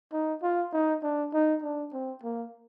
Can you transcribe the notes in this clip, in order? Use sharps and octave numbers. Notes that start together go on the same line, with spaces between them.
D#4
F4
D#4
D4
D#4
D4
C4
A#3